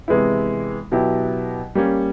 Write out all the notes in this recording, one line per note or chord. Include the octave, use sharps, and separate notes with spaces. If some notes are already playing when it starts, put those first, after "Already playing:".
C3 E3 G#3 B3 E4
B2 F#3 B3 E4 G4
G3 A#3 C#4